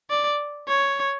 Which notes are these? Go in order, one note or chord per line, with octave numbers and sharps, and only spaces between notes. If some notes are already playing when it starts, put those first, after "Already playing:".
D5
C#5